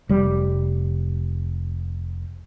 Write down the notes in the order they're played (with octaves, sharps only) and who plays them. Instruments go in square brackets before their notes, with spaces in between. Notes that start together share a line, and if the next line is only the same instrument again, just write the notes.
[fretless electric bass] F1 G3